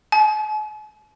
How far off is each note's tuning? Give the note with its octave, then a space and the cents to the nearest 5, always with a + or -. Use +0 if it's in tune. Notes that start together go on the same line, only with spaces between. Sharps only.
G#5 +45